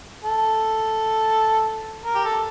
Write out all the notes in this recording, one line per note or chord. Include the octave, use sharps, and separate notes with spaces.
A4
A#4
G4
A4